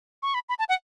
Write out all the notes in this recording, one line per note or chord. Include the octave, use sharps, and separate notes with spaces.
C#6
B5
B5
A5
F#5